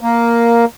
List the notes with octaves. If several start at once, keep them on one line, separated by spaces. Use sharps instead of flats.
A#3